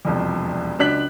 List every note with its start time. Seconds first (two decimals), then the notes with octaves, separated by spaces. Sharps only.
0.05 E1 C2 F2
0.78 C#2 F#3 D4 F#6 B6 F#7